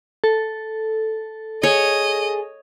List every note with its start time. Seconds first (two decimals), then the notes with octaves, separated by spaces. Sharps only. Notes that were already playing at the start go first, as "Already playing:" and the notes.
0.24 A4
1.63 G#4 C#5 D#5